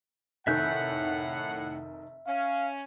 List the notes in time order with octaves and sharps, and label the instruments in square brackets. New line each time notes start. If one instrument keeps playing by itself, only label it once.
[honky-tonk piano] F1 D#3 G#5 [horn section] A2 F#5 [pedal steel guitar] E5 F#6 G6
[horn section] C#4 [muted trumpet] F5